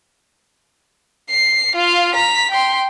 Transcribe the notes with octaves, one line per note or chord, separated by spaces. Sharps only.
C7
F4 F5
A#5 B6
G5 C6